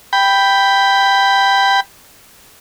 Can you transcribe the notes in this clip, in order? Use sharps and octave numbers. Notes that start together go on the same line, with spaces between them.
G5 B5